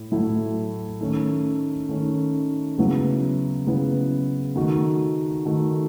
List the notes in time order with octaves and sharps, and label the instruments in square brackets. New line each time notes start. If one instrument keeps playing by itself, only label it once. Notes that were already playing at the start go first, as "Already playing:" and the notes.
Already playing: [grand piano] A2
A2 F#3 A3 E4
D#3 A3 C#4
D#3 A3 C#4
C#3 F#3 B3 E4
C#3 F#3 B3 E4
D#3 A3 D#4 F#4
D#3 A3 D#4 F#4